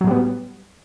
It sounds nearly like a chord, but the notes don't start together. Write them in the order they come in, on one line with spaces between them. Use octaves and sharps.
F#3 A2 G3 B3